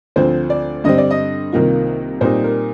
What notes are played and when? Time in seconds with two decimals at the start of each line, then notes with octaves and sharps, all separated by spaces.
0.16 D2 D3 F3 C4 C5
0.50 D5
0.84 G2 D3 G3 C4 D#5
0.98 D5
1.11 D#5
1.52 C2 C3 D#3 A#3 F4
2.21 A#2 G3 C4 D#4 C5
2.44 A#4